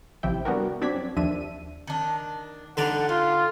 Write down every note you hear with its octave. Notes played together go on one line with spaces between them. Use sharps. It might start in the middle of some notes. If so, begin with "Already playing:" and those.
A1 C3 F3 E4 G5
G3 B3 D4 F#4 A#4
C4 D4 F#4 D5 G#6 B6
F#2
D#2 F3 D4 E5 D#7
D#3 D4
D3 E3 G3 D4 D#4 D5 F#5
F4 G4